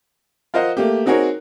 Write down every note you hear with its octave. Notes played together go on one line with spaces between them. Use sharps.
F4 A#4 C5 D#5 F#5
A3 A#3 G4
C4 D#4 F#4 G#4 A#4 C#5